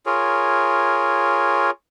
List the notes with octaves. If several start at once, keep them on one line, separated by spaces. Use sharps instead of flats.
F4 G#4 A#4 C#5